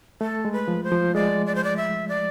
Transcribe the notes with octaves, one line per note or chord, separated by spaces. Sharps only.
A3 A4
G#3
B4
F3
C5
F3
G#3 D5
D5
C5
D5
E5
D5